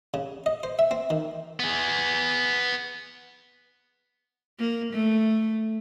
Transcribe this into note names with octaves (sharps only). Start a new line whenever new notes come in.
C#3
D#5
C5
E5
C4
D#3
B3 G#4
A#3
A3